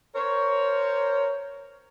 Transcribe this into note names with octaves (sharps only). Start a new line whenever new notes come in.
A#4 C5 C#5